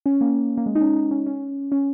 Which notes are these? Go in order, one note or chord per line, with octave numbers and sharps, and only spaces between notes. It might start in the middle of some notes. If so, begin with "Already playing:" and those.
C#4
A#3
A#3
G#3
D#4
C#4
D#4
C#4
C#4
C#4